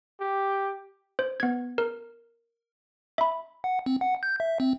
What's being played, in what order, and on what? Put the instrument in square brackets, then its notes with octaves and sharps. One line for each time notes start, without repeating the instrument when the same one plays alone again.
[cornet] G4
[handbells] C5
B3 G#6
A#4
E5 B5
[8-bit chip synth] F#5
C4
F#5
G6
E5
C4